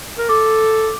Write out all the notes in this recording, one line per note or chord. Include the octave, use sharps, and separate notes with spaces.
A#4
A4 D6